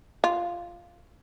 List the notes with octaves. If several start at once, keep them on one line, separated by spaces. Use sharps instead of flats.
F4